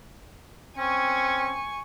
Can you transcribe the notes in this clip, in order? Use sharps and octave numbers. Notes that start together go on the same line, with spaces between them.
C4 C#4 G#5 C#6